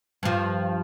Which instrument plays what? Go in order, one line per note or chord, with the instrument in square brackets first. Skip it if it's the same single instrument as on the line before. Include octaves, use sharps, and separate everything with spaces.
[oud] G2 F3